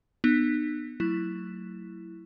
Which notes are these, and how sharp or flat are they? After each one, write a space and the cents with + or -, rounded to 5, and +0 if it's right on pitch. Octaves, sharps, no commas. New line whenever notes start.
B3 +0 D#4 -40
F#3 +0 A3 +30 E4 +0